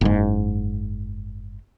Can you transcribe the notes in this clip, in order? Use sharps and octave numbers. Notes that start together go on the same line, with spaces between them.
F#1 G#2